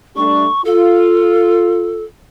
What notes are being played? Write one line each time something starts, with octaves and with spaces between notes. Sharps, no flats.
G3 A3 D4 C#6
F4 A4